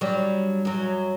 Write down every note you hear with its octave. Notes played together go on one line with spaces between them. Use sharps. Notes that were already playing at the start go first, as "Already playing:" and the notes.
F#3 G3 D4
F#2 F#3